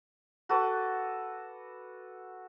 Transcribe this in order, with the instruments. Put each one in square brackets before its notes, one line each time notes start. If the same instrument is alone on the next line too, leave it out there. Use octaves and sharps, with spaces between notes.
[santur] F#4 A4 B4 D6